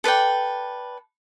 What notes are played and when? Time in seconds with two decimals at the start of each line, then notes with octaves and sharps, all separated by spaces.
0.04 A4 B4 D5 G5